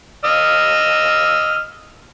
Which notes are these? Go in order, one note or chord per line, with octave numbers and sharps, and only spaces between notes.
D#5 E6 F6